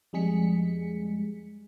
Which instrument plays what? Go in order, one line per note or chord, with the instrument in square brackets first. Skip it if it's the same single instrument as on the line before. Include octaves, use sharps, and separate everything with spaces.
[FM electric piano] F2 G3 G#3 G#4 B6 C#7